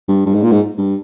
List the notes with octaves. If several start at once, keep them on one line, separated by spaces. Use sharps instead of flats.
G2
G2
G#2
A#2
G#2
G2